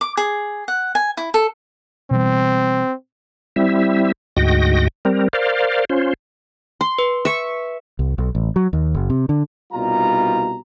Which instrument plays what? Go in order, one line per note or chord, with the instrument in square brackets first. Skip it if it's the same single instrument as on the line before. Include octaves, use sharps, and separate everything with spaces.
[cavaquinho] D6
G#4
F#5
G#5
E4
A4
[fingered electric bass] B2 E3 G3 [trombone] C4
[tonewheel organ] G3 C4 E4 E5
D2 G#2 F#4 D#5 G5 A#6
G3 C4 A#4
A#4 C5 D5 F5
C#4 F4 C5
[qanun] C6
[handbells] B4
[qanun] E5 C#6
[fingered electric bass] C2
B1
A1
F#3
D#2
F#1
C3
D3
[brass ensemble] C2 B2 G3 D#4 F4 A#5